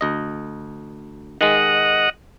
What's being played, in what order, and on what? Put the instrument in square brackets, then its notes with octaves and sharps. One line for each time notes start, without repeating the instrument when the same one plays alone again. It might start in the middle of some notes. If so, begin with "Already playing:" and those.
[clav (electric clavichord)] D2 D#5
[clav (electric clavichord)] D#3 G#3 [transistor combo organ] D#5 F#5